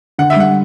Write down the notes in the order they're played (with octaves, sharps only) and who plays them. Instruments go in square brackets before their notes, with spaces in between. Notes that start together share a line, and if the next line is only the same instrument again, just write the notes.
[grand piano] D3 [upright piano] F#5
[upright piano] E5
[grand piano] G3 [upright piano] F#5